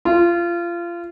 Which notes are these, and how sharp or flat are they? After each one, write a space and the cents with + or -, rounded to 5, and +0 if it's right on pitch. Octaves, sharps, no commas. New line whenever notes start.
F4 -25